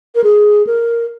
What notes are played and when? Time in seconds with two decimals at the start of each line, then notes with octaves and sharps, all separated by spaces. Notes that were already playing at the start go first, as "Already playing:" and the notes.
0.15 A#4
0.24 G#4
0.67 A#4